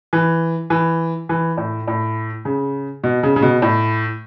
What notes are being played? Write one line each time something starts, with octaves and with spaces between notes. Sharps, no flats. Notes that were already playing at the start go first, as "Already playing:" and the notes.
E3
E3
E3
A2
A2
C#3
B2
C#3
C#3
B2
A2